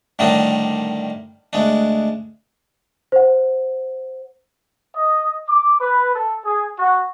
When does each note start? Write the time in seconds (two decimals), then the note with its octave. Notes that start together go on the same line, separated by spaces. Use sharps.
0.19 A2 D3 D#3 G3 D4 D#4
1.53 D2 G#3 D4
3.12 C5 F#5
4.96 D#5
5.49 D6
5.79 B4
6.15 A4
6.45 G#4
6.79 F#4